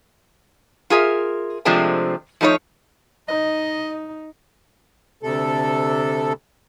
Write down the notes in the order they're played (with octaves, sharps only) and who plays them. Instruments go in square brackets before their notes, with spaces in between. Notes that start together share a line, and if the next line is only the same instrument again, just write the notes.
[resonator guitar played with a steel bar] F4 G#4 A#4 E5
C3 F3 G#3 A3 C4 D4
F3 A3 D#4 A#4 C#5
[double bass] D#4 [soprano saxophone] D#5
[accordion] D2 C3 A4